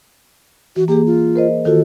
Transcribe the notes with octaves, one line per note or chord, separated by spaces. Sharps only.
E3 F#4
A#3 G4 G#4
F4
A#4 C5 D#5
D#3 F4 F#4 A4